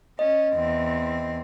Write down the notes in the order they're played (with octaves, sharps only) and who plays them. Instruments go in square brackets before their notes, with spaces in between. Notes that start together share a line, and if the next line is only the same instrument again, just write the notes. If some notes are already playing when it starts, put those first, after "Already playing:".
[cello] C#4 [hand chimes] D#5
[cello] E2 C4